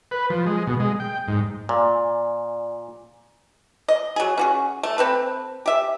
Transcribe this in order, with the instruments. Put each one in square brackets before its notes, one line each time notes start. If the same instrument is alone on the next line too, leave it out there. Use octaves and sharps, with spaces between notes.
[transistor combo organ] B4
F3
G#3
B2
G#3
G5
G#2
[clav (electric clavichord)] A#2 [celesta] D5 [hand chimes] G#5
[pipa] D#5
F#3 G#4
C#4 F#4 G#4
A3
C4 A4 B4
G4 E5